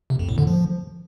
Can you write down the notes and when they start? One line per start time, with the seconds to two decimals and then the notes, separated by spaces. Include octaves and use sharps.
0.10 C3
0.19 F2
0.29 A2
0.38 D3
0.47 F3